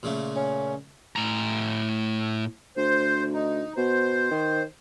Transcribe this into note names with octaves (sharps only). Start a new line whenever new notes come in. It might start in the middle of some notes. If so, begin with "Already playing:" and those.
A#2 C#3 A3
C#4
A2 A#5
D2 C5
D#4
B2 C5
D#3